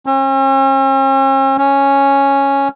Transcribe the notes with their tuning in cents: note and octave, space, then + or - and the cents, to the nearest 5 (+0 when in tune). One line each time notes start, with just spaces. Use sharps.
C#4 -45
C#4 -5